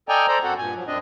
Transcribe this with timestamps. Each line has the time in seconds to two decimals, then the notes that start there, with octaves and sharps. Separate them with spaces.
0.09 A4 D5 D#5 G5 G#5 A#5
0.28 A4 C5 D5 A#5
0.43 F#2 C4 F#4 A4 F#5
0.58 G2 A#2 G#5
0.74 F3 F#3
0.87 F#2 C4 D4 D#5